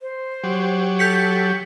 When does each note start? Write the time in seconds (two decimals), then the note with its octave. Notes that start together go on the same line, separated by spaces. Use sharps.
0.01 C5
0.44 F#3 G4
0.99 A4 G6 B6 C#7